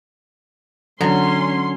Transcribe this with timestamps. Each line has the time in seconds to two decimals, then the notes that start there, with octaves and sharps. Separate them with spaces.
1.01 D3 F#3 C#4 C6